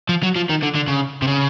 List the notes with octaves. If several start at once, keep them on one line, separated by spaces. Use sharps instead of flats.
F3
F#3
F3
D#3
D3
D3
C#3
C3
C#3